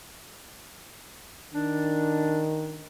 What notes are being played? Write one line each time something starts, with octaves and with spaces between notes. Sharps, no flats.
D#3 D4